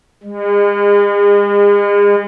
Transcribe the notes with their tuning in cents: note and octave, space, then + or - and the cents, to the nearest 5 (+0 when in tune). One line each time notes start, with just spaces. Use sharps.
G#3 -40